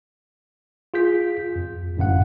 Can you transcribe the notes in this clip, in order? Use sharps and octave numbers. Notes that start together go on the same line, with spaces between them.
F4 G#4 G6 B6
F2
G1 F#2 A2 F5 F#5